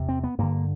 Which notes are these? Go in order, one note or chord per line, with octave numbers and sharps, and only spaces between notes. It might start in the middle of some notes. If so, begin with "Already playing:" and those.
Already playing: E2 C3
C4
B3
G2 D3 A#3